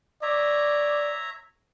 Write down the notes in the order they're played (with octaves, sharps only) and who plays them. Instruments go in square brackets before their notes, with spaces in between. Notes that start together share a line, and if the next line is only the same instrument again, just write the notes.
[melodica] C#5 E5 A#5 [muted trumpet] D5